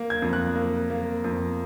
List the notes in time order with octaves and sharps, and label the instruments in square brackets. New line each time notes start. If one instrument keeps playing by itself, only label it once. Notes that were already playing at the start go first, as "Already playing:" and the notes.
Already playing: [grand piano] A#3
G#6
F2
F#6
A#3
A#3
F2